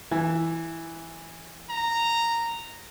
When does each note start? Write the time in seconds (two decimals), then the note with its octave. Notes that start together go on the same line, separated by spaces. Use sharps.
0.11 E3
1.70 A#5